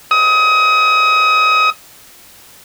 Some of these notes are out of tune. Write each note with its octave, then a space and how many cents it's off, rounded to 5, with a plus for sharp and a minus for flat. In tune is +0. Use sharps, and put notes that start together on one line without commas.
D#6 +25